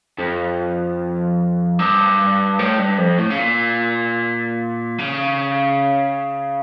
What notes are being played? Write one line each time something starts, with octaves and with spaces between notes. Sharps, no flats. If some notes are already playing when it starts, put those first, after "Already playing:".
F2
G2
A2
G2
F2
A2
C#3
A#2
C#3